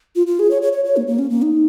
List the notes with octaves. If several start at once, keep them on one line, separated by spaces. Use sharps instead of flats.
F4
F4
G#4
C#5
C#5
C#5
C#5
A#3
A#3
C#4
A#3
D#4